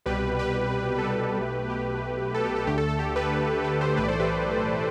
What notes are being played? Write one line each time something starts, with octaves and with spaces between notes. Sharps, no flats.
C2 B2 G3 G4 B4
G4 B4
A4
G4 B4
B1 B2 A3
G4
A4
G4
A4
D2 D3 A3 G4
A4
A4
G4
G4 B4
G4 B4
A4 C5
B1 A2 E3 A3 G4 B4
D5
A4 C5
G4 B4